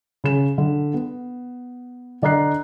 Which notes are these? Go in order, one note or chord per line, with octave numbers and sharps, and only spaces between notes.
C#3 E7
D3
B3
D3 D5 D#5 A#5 F#6 C7